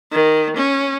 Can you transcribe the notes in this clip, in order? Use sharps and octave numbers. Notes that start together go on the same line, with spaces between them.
D#3
C#4